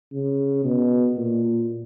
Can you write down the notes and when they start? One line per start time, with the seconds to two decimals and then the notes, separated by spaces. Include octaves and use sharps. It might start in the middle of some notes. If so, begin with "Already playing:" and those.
0.13 C#3
0.64 B2
1.17 A#2